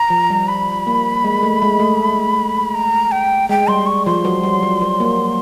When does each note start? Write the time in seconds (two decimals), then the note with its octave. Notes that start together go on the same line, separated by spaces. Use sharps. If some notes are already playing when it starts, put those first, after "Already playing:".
Already playing: A#5
0.10 F3
0.30 G3
0.48 B5
0.87 A#3
1.24 G#3
1.43 A3
1.62 G#3
1.80 A3
2.74 A#5
3.12 G5
3.49 G#3 G5
3.68 G3 C6
3.86 C#6
4.06 F3 C6
4.25 F#3
4.43 G3
4.62 F#3
4.81 F#3
5.00 A#3